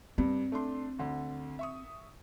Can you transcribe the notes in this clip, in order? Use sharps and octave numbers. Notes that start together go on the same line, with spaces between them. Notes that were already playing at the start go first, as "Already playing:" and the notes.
G2 C4
A3 D4 C6
D2 D3
E5 C#6 D#6